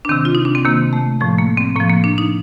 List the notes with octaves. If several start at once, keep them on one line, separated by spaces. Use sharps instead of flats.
D4
C3 D#3 C4
F4
D#4
D4
C4
C3 D#3 A#3
A3
A2 F3 A3
A#3
C4
A2 F3 A#3
A#3
D4
D#4